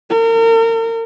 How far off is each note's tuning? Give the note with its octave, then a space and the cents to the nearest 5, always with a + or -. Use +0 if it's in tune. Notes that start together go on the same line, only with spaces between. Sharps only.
A#4 -35